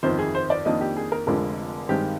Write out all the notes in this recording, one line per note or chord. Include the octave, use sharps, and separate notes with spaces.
G1 F2 D#3 C5
G#4
C5
D5
F2 D#3 A#3 D4 D#5
G4
G#4
A#4
F1 F2 D3 F3 G#3 A#4
G2 D#3 G#3 C4 G4